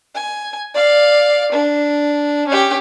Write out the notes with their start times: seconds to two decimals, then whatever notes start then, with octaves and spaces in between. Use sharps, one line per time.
0.15 G#5
0.74 D5 F5
1.52 D4
2.47 C#4 G4